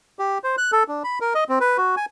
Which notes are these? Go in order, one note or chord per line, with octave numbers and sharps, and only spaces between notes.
G4
C5
F#6
A4
D4
B5
A#4
D#5
C4
B4
F#4
G#5